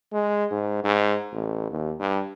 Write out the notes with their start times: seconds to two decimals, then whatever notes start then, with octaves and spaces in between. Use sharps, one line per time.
0.13 G#3
0.51 G#2
0.84 G#2
1.33 A1
1.71 D#2
2.00 G2